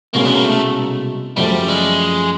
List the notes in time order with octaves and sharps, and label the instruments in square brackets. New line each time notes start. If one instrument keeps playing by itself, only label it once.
[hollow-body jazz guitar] C2 B2 G#3 C#4 [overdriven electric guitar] A#3
[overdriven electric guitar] B3
A#3
A3
[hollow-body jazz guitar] F#2 C#3 F3 A3 [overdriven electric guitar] G3
[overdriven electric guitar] G#3